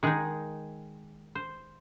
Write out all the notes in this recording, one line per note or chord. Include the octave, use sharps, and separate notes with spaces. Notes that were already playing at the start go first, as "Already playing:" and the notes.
D#3 G#3 D#4 G#4
C5